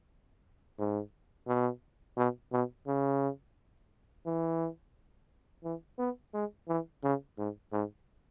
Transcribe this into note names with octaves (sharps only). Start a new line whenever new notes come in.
G#2
B2
B2
B2
C#3
E3
E3
B3
G#3
E3
C#3
G#2
G#2